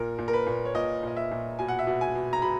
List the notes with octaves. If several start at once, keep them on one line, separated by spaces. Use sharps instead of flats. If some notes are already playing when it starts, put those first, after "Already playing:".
Already playing: A#2 A#4
A#2
A#4
B4
A#2
C#5
A#2 D#5
A#2 D#5
E5
A#2
B2 G#5
F#5
E5
B2 F#5
G#5
B2
A#5
B2 B5